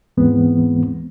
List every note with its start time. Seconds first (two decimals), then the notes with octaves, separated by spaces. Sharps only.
0.17 D#2 G#2 E3 G#3 B3 C4